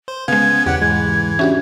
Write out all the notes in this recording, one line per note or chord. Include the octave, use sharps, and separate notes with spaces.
C5
C#3 G#3 B3 F5 G#6
E2 C#3 G4 F#5
G#2 E3 G#3 G#6
C#4 D4 F#4 G4 E5